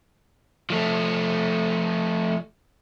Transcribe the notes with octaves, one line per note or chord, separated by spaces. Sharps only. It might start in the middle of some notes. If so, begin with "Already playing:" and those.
F3 A3